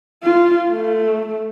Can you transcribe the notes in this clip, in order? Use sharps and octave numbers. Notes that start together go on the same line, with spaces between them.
F4
A3